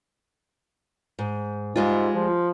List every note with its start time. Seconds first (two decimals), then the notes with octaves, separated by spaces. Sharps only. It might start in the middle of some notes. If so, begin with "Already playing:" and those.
1.19 G#2
1.76 G#2 G3 G#3 F4
2.15 F3